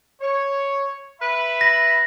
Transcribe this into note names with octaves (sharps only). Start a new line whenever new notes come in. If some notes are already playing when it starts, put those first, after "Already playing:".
C#5
B4 E5 B5
A#6